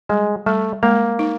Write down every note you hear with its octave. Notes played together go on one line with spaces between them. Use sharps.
G3 G#3
G3 A3
G#3 A#3
D#4